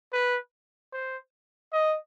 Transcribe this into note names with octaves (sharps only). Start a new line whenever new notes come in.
B4
C5
D#5